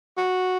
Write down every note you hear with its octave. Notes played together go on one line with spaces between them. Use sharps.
F#4